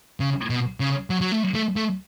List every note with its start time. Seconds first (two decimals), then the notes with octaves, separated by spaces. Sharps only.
0.20 C#3
0.50 B2
0.80 C#3
1.10 F#3
1.21 F#3
1.32 A3
1.54 A3
1.76 A3